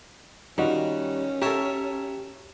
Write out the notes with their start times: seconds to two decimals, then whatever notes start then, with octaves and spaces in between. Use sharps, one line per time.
0.58 D#3 G3 C#4 D#4 F4 F#4
1.42 G4 A4 A#4 C#5 E5